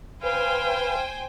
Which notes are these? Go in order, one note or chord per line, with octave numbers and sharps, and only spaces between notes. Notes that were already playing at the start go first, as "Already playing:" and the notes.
B4 C5 F5 G5 G#5